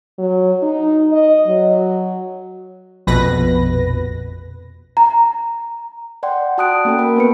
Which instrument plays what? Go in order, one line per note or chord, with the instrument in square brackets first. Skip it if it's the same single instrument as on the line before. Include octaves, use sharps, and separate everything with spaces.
[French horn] F#3
D#4
D#5
F#3
[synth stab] A#1 F2 B2 B4 A#6
[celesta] A#5
[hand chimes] D5 F#5 G5 C6
F#4 A5 D#6 F#6 D7
A#3 C#4 F#4 A4 G5
A#4 G5 B5
B3 B4 C#7